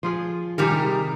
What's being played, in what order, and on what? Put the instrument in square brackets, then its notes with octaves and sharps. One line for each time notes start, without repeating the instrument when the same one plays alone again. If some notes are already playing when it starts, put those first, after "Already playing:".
[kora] F3 F4 G#4
[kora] C3 G4 A#4 [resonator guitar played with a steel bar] D#3 G3 G#4